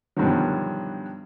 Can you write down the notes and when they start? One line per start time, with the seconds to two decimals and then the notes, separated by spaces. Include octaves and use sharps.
0.16 G2 B2 D3 D#3 F3 F#3